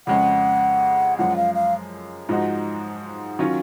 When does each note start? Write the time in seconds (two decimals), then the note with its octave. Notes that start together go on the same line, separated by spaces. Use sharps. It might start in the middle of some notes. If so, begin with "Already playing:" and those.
0.07 F2 C#3 G#3 C#4 F#5
1.18 F#2 F3 G#3 F#5
1.36 F5
1.55 F5
2.29 G#2 F3 G#3 D#4 F#4
3.39 D#3 F#3 C#4 F4